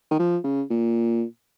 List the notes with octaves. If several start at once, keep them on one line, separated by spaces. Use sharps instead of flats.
D#3
F3
C#3
A#2